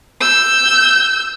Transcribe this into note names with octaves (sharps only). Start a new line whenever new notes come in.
E6 G6